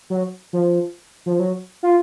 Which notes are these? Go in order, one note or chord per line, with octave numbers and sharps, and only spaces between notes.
F#3
F3
F3
F#3
F4